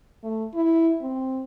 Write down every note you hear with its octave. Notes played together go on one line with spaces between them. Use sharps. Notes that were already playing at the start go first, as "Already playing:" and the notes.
A3
E4
C4